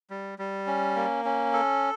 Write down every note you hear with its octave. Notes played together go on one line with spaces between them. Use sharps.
G3
G3
C#4
A#3
C#4
A4